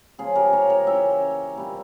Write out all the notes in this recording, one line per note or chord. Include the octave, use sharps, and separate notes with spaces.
C#3 F3 A#3 C#4 F4 G#4
G4 A#4
A#4 C#5
A#4 C#5
E3 A#3 C#4 E5 G5
A#2 G3 C4